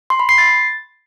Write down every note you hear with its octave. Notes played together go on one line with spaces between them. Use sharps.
C6
B5
C7
A6